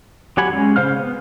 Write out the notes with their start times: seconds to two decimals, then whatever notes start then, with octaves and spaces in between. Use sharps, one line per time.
0.37 F#3 G4 F#5 G#5 B5
0.52 G#3 C#4
0.76 C#3 C5 F5 F6
0.96 B3